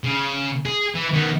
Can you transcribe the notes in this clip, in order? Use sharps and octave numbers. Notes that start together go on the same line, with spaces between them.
C#3
G#4
E3
D#3 B3